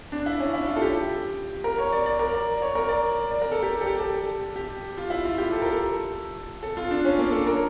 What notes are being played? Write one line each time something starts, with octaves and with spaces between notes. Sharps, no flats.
D4
E4
C#4
E4
F4
A4
G4
A#4
C#5
D5
D5
A#4
D5
C#5
A#4
D5
D5
A#4
A4
G4
A4
G4
A4
G4
F4
E4
F4
G4
A4
A#4
A4
A4
F4
D4
C#4
A#3
A4
A#4